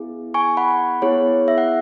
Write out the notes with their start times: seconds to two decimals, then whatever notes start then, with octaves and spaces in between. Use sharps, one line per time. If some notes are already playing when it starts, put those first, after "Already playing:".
Already playing: B3 E4 G#4
0.34 G#5 C#6
0.57 F#5 B5
1.02 B3 E4 G#4 C#5
1.48 E5
1.58 F#5